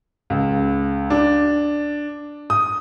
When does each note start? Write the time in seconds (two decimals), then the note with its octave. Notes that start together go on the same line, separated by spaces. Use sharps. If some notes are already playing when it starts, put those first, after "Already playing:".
0.30 C#2
1.10 D4
2.50 D#6